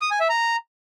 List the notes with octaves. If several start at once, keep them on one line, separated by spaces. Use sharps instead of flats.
D#6
G#5
E5
A#5